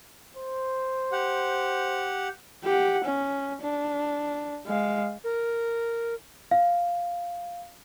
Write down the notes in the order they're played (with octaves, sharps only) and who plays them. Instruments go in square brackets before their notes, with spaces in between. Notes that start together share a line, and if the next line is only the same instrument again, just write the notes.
[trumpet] C5
[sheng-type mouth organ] G4 F#5
[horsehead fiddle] G4 F#5
C#4
D4
G#3 F5
[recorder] A#4
[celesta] F5